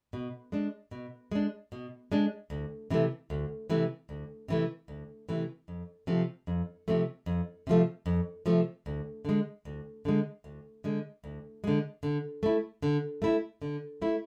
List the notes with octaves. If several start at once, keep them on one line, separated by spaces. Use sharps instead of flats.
B2
G#3 D4
B2
G#3 D4
B2
G#3 D4
D2
C3 E3 A3
D2
C3 E3 A3
D2
C3 E3 A3
D2
C3 E3 A3
F2
C3 F3 A3
F2
C3 F3 A3
F2
C3 F3 A3
F2
C3 F3 A3
D2
D3 G#3
D2
D3 G#3
D2
D3 G#3
D2
D3 G#3
D3
A3 E4
D3
A3 E4
D3
A3 E4